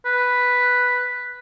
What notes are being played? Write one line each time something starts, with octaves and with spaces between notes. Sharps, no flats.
B4